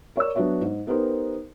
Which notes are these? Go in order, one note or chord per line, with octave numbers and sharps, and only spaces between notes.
A#4 C#5 D5 E6
F#3 B3 D4 F#4 C#5 E5
G#2
B3 D#4 G4 A#4 C5